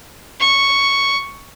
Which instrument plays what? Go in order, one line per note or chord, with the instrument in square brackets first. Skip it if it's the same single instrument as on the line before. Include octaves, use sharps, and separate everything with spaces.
[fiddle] C#6